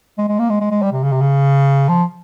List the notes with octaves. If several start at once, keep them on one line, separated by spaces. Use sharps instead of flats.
G#3
G#3
A#3
G#3
G#3
G#3
G3
C3
C#3
C3
C#3
F3